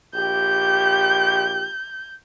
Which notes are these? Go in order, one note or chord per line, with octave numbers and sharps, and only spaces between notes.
A#1 G4 G6